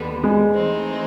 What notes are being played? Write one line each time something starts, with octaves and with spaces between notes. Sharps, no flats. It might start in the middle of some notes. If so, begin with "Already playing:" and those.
Already playing: D#2 D3 G3 B3
G#3
E3 A3 C4 D#4